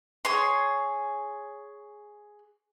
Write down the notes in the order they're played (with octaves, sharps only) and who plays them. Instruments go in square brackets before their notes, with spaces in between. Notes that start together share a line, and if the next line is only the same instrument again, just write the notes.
[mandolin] G#4 C#5 C6